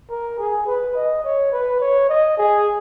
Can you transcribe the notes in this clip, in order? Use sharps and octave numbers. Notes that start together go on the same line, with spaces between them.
A#4
G#4
B4
D#5
C#5
B4
C#5
D#5
G#4